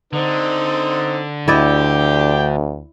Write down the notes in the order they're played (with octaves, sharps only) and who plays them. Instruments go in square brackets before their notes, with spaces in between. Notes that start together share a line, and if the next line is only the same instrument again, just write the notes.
[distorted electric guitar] D3 [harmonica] C4 D#4
[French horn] D2 [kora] E4 D5 D#5 [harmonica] G5 D6